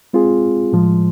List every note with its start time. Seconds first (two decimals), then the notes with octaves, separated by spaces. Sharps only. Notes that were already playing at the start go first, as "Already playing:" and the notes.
0.13 G#3 C4 F4 G#4
0.72 A2 F3 G#3